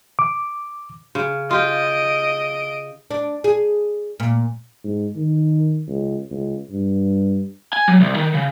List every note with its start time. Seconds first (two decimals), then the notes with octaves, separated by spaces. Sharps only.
0.19 D6
1.15 C#3
1.51 F4 G4 D#5 D7
3.11 D4
3.44 G#4
4.20 A#2
4.85 G#2
5.16 D#3
5.88 C#2
6.31 C#2
6.71 G2
7.73 G#5
7.88 F#3
8.01 C2
8.16 D#3
8.34 C#3